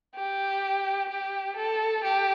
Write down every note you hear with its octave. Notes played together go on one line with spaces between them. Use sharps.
G4
G4
A4
G4